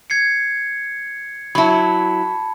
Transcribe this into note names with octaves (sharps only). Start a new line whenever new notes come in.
G#6 C7 C#7
F#3 E4 A5 B5